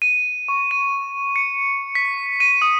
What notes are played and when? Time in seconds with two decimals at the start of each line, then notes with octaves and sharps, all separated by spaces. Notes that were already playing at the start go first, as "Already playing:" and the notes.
0.02 D#7
0.48 C#6
0.71 D#7
1.36 C#7
1.95 B6
2.40 D#7
2.62 D#6